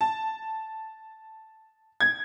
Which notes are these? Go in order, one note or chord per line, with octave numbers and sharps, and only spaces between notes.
A5
G#6